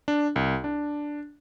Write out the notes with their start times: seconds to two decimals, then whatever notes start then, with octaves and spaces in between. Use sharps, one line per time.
0.08 D4
0.36 C2
0.64 D4